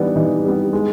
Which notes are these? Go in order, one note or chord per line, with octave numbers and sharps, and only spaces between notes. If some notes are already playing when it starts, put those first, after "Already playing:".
Already playing: E3 G3 B3 D4 D#4
E3 D#4
G3 B3
G#3